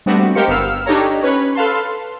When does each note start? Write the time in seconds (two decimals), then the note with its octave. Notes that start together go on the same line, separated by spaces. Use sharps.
0.06 G3 A3 B3 C4 D4 F#4
0.35 G#3 G4 A#4 C5 F5 C#7
0.48 G1 B3 F5 E6 F6
0.86 D4 D#4 G4 A4 C#5 A#5
1.23 C#4 B4 C#5
1.55 A4 B4 F5 A5 C6